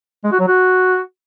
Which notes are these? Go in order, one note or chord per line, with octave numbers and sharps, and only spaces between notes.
G#3
F#4
F#3
F#4